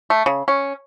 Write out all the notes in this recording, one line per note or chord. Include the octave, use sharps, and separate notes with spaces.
A3
C#3
C#4